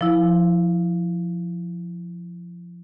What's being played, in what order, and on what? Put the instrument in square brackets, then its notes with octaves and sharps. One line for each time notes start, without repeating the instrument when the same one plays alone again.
[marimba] F3 E4